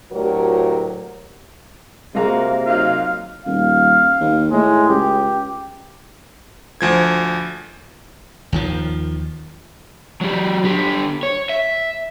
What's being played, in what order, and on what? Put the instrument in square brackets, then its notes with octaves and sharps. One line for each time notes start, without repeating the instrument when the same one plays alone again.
[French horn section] D2 A2 F#3 G4 A#4
[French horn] C3 [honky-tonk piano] G#3 A#3 [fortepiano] F4 F#4 A#5
[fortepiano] F#3 D#4 F4 [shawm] F5
[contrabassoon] D#1 [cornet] F5
[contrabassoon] D#2
[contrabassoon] A2 [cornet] G#3
[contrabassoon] C#2 [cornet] G4
[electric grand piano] D2 F3 G#6
[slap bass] D#2 D#3 F3
[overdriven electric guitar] F#3 G4
D3 G4
C#5
E5